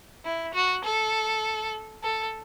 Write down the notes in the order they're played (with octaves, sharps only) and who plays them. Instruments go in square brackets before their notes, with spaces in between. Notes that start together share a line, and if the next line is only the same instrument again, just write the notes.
[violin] E4
F#4
A4
A4